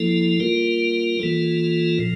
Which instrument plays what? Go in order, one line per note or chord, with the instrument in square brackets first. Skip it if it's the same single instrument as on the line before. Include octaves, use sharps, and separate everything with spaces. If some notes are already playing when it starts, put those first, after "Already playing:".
Already playing: [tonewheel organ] F3 A#3 E4 A4
G3 A#3 F4 A#4
E3 A#3 F4 A4
A#2 F3